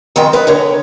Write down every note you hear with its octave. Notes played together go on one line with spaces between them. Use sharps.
F2 D#3 G#3 C4 G5
A#4 B4 D#5
D3 A#4 C#5